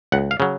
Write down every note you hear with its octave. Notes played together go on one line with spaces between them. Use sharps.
C#2 F#5
F5
C#3 F#3